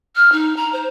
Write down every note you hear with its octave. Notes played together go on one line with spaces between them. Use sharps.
F6
D#4
A#5
C5